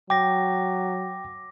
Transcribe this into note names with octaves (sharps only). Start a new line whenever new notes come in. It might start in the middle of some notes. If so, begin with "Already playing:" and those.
F#3 G5 D6 A#6